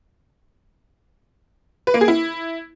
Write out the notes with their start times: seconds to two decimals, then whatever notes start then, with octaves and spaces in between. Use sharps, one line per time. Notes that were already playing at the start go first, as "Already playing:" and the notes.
1.87 B4
1.94 A#3
2.01 G#4
2.08 E4